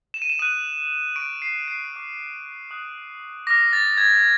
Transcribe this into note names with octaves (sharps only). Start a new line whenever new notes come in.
E7
D#7
E7
D#6 F#6 D#7
C#6 F6 D7
C7
C7
D6 F6
D#6 F#6
D6 F6 A#6
A6
G#6